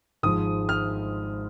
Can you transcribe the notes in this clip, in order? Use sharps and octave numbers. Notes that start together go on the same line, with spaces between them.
G#1 G#2 F3 D#6
F6